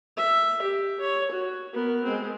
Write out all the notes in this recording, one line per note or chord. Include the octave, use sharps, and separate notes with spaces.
E5
G4
C#5
F#4
B3 A#4
G#3 C4